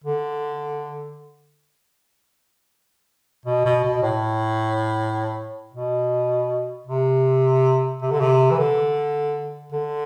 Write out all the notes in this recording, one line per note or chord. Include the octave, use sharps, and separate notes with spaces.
D3
B2
B2
B2
A2
B2
C3
C3
D3
C3
E3
D3
D3